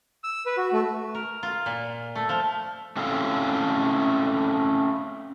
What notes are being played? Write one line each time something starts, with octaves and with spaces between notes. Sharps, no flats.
E6
B4
F#4
A3
A#4
F4
A#2
A3
F3
A3 C4 C#4 E4 A4 F5